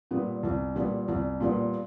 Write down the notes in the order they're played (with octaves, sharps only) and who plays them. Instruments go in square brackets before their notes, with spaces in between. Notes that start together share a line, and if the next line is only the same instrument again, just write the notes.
[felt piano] A#2 G3 B3
C2
A#2 G3 B3
C2
A#2 G3 B3